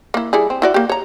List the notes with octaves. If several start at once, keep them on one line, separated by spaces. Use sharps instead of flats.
A#3 E4
G3 E4 G#4
C4
E4 F#4 D5
A#3 G4
C#5 A#5